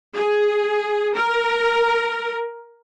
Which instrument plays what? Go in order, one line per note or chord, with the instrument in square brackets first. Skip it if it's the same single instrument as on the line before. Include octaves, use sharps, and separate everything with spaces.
[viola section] G#4
A#4